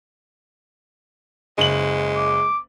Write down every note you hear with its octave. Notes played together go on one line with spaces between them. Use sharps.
F#1 G#3 F#7
D6